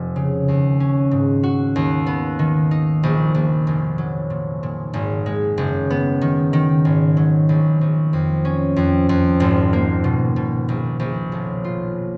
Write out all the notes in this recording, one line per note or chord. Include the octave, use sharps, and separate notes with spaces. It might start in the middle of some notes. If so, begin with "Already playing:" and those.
Already playing: F1
C#3
D#2
C#4
G#2
F#4
D#2
B3
D#3
D#4
A#1
A#1
F1
F#3
A#2
A#2
G#1
G#3
F#1
B3
D#3
D#3
G#1
F#3
A#1
A#1
F2
C#4
F2
F2
G#1
A#3
B2
B2
A#1
A#1
B1
F4